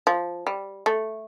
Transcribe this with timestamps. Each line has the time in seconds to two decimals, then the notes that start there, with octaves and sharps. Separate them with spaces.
0.07 F3
0.47 G3
0.86 A3